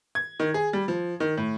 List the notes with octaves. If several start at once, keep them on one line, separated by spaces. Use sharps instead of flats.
G#6
D#3
G#4
G3
F3
D#3
A2